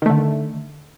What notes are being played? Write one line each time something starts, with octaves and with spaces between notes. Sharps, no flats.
D3 D#3 A3